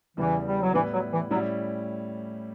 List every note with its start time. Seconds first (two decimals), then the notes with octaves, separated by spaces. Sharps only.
0.17 E2 C#3 E3 G3 B3
0.46 G3
0.61 F#3
0.74 A2 E3 G3 B3 E4 B4
0.93 F#3
1.12 E3
1.31 A2 F#3 G3 C#4 E4